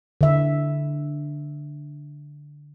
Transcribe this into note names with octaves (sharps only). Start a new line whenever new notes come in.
D3 E5